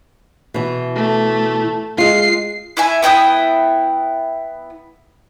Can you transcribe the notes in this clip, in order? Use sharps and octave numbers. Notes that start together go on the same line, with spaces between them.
B2 E3
A3
G#3 F4 C7
E4 E5 G#5
B3 E4 G5 D#6